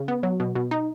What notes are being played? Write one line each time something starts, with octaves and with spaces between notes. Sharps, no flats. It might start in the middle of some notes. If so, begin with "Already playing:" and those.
Already playing: C#3
B3
F#3
B2
B2
D#4